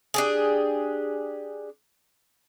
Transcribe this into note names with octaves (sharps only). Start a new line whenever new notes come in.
D4 G4 G#4